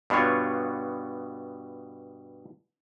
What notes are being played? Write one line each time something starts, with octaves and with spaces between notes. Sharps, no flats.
G2 B2 B3 F4 C#5